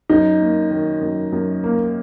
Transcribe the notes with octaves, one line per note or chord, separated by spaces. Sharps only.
F#2 D#4
A#3
D#3
F#2
F#2
A#3